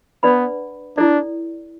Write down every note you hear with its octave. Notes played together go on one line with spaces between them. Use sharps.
B3 D4 B4 D5 F#5 B5
D4 E4 A4 D5